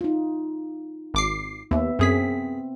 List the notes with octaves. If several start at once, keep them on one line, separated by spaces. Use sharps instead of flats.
D#4 F4
G#1 D6 C7
D#2 B3 E5
F#2 C4 G#4 B6